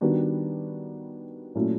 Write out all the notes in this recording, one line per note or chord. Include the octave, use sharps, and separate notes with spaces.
D#3 G3 B3 D4 F#4
A#2 F#3 A3 C#4 E4